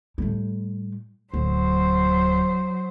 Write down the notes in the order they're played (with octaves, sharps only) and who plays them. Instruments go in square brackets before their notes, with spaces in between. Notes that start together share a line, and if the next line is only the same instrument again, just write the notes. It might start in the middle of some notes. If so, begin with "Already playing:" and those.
[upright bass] A2 G3
[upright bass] D1 [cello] F#3 C5